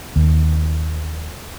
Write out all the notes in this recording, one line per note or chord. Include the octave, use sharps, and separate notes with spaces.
D#2